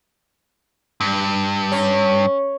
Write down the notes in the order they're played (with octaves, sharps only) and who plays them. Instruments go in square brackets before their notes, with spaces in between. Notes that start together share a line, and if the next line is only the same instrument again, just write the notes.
[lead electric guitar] G2
[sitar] C#4